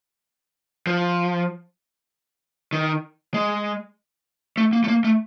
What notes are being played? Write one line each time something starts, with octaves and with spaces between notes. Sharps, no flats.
F3
D#3
G#3
A3
A#3
A3
A#3
A3